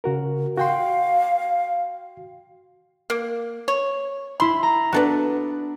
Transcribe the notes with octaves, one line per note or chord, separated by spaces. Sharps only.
C#3 F#4 A#4
F#4 F5 G5 C6
A#3
C#5
E4 B5 C6
A#5
B3 D4 F#4 A4 B4